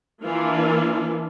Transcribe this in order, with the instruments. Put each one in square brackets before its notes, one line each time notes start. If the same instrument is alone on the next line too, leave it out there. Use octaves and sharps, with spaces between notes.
[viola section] E3 A#3 D4 E4 F4